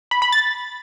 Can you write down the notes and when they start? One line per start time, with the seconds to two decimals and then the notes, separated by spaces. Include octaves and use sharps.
0.11 B5
0.22 B5
0.32 A6